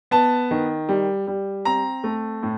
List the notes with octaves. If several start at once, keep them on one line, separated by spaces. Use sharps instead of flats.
B3 A5
D#3
G3
G3
C4 A#5
A3
A2